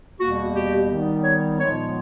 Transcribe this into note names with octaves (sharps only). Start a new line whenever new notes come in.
E2 B2 G3 A#3 F#4
G4
D#3 G3 B3 D#4
C#5
A#2 F3 G#3 B3 C#5